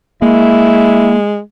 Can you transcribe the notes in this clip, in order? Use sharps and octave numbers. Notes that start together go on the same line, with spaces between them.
G#3 A#3 E4